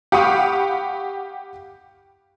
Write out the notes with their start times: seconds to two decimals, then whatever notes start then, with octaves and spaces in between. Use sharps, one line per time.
0.12 G4 F5 F#5 B5 C#6 D#6